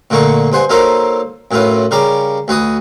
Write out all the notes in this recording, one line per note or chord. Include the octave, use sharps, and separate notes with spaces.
A#2 D3 A3 A#3 C#6
G2 C5 F#5 G#5
F#3 A#3 D#4 A4 A#4 C5
F#2 A2 E4 F4 B4
C#3 G3 A#4 D5 B5 D6
D2 F#4 B4 D#6